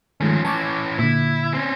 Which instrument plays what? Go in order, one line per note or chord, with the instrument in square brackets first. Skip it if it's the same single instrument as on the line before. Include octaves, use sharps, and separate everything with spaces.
[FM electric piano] D#3 G#3 A3 [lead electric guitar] F3 C#4
[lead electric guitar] E3 C#4 [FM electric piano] A5 C#6 D6
[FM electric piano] A#2 D3 [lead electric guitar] E4
[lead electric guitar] C4 C#4